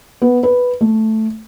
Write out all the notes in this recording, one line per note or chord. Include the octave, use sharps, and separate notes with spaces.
B3
B4
A3